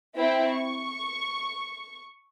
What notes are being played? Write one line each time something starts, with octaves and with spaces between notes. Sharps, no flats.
C4 E4 G5
C#6